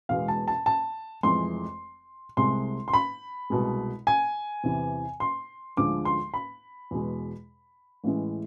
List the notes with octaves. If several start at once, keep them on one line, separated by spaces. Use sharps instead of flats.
E1 E2 B2 G#3 F5
A5
A5
A5
F1 F2 E3 G#3 C6
C2 C3 G#3 C6
C6
B5
C2 B2 G#3
G#5
E2 C3 E3
C6
D2 D3 F3 G#3 D6
C6
B5
E2 B2 G#3
A1 A2 E3 G#3